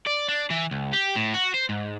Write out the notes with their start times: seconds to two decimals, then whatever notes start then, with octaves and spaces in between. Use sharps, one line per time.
0.07 D5
0.28 D4
0.50 E3
0.71 C#2
0.93 G4
1.15 A2
1.34 F#4
1.54 C5
1.69 G#2